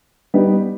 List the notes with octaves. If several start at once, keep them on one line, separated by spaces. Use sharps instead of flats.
G3 B3 D#4